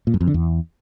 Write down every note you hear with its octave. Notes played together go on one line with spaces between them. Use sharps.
A#2
F#2
F2
D3
E2